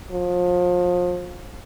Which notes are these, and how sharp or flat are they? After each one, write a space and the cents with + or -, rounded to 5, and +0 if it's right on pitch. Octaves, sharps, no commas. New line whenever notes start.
F3 +30